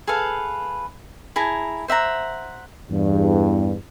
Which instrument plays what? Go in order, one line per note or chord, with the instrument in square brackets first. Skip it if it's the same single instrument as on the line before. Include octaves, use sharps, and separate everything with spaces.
[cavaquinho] G#4 A4 B4 F5
E4 G#4 A5 A#5
C5 E5 F#5 A#5
[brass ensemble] E2 G2